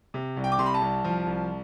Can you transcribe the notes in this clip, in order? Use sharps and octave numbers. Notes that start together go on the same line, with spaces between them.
C3
C2
G5
D6
C3 C6
B5
A5
C2
F3
C2